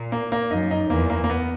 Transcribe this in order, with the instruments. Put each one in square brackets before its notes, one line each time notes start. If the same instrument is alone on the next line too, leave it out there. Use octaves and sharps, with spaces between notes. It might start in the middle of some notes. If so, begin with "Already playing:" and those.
Already playing: [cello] A#2
[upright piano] A#3
A#3
[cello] F#2 [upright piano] D#4
[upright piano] D#4
[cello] E2 [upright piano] A#3
[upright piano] A#3
A#3
B3